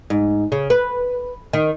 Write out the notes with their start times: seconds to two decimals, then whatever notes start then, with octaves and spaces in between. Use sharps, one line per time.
0.10 G#2
0.52 C#3
0.70 B4
1.53 D#3